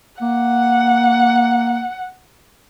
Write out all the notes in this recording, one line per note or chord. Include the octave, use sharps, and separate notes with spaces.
A#3 F#5